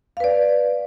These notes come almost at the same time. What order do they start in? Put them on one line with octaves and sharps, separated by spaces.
F5 B4 D5